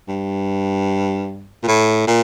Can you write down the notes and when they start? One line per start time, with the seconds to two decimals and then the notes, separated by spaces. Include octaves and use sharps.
0.09 G2
1.63 A#2
1.68 A2
2.07 A#2